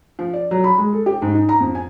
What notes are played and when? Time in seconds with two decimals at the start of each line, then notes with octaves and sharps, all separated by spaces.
0.19 F3
0.34 D5
0.51 F#3
0.64 B5
0.78 G#3
0.93 A4
1.06 G4
1.22 G#2
1.34 D#4
1.49 A#5
1.60 F2
1.75 G#5